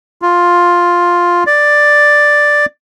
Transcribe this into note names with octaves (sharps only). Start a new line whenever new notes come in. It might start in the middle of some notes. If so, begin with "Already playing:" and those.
F4
D5